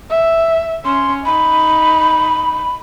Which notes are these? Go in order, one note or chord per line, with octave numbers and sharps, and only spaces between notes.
E5
C#4 C6
D#4 B5